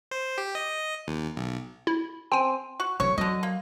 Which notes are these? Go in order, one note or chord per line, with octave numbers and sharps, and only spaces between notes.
C5
G4
D#5
D#2
B1
E4
C4 G5 G#5
F#4
D3 F#3 C#5
D3 F#3 D#5
A#3